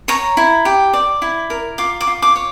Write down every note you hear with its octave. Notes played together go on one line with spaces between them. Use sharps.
C#5 A#5
E4
G4
D5
E4
A#4
F4 D6
D6
F4
D6
C#5